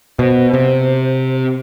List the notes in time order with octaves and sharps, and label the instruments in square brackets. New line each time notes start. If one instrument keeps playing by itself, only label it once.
[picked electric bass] B2 [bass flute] C5
[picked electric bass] C3